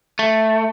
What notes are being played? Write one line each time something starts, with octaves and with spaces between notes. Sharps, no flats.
A3